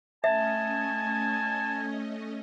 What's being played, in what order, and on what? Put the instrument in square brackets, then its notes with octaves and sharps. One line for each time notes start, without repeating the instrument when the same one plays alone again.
[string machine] A3 C#4 D#5 [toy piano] E5 [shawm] G#5 [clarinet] A5